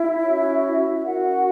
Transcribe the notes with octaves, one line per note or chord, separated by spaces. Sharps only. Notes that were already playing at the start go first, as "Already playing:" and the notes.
Already playing: E4 E5
C#4 F#4 C#5
E5
C#4 E4 F#4 A#4 F#5